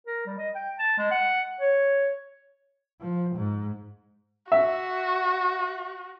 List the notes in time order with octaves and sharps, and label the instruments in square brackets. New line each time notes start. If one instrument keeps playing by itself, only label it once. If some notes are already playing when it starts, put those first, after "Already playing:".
[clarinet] A#4
G3
D#5
G5
A5
G#3
F#5
C#5
[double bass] F3
G#2
[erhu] F#4 [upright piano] E5